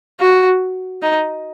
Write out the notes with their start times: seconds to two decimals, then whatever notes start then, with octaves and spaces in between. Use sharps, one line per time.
0.20 F#4
1.02 D#4